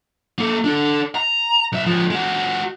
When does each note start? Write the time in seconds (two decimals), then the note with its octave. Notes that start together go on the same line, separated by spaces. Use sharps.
0.38 A#3 A4
0.64 D4 A4
1.15 A#5
1.72 B1 E5
1.86 F3 G#3
2.10 G#3 F#4